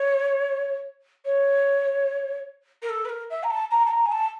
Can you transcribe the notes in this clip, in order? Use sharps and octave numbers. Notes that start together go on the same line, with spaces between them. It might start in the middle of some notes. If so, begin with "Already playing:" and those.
Already playing: C#5
C#5
A#4
A4
B4
A#4
E5
A#5
A5
A#5
A5
A#5
G#5
A5